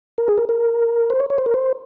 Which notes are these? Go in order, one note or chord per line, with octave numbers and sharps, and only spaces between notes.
A#4
G#4
A#4
A#4
C5
C#5
C#5
C5
A#4
C5